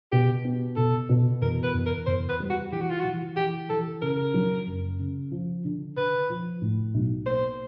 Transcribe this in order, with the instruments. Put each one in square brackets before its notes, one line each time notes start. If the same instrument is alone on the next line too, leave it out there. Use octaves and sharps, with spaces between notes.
[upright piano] B2 [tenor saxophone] G4
[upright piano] B3
[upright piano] B2 [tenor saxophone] A4
[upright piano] B2
[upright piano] E2 [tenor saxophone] A#4
[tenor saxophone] B4
[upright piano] E2
[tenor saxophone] A#4
[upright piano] E2 [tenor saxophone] C5
[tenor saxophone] B4
[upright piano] G3
[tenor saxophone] F#4
[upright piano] E3 [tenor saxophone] G4
[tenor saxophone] F#4
F4
[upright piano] E3 [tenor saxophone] F#4
[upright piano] E3 [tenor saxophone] G4
[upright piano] E3 [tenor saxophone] A4
[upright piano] C#3 [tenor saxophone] A#4
[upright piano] F#3
F#1
C#3
F3
D3
[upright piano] D3 [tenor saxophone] B4
[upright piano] F3
A2
B1
[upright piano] A#3 [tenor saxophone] C5